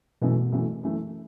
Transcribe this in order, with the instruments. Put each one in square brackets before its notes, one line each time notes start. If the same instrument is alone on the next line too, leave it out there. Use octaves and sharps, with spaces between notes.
[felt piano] F#2 E3 A3 [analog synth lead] B2
[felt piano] F#2 E3 A3
F#2 E3 A3